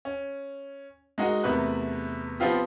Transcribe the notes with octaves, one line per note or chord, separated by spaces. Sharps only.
C#4
G#3 D#4 F#4 A#4
E2 C3 A3 A#4 B4 F#6
F3 B3 C4 F4 G4